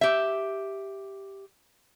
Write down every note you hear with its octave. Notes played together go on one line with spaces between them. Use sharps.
G4 E5